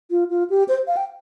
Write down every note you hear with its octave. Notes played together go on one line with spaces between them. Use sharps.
F4
F4
G4
C5
F5
G5